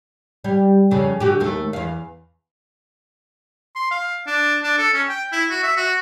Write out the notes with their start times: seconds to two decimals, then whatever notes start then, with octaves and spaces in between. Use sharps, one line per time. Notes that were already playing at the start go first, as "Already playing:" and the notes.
0.44 G3
0.91 F2 C#3
1.20 D3 F#4 G4
1.40 D#2 A3
1.73 E2 F5
3.76 C6
3.91 F5
4.27 D4
4.63 D4
4.78 A4
4.94 C#4
5.09 G5
5.32 E4
5.50 F#4
5.63 E5
5.77 F#4